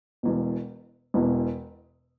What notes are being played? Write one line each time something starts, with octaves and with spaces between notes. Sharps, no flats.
E1 E2 B2
E1 E2 B2